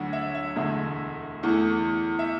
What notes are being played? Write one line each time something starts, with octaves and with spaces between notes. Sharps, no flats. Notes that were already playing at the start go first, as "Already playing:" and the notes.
Already playing: D2 D3 F#3 D4 F#5
E5
E5
E1 D2 D3 E5
E2 E3 A3
E5